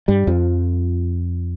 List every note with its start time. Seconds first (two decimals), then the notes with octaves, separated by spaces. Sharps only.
0.08 G2 G3
0.27 F2 F3